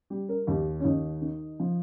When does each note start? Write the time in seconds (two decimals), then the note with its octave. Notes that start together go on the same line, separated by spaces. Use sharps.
0.10 G3 G4
0.29 A#4
0.47 D#2 G4
0.80 C#4
0.84 D#2 D#4
1.21 D#3
1.60 F3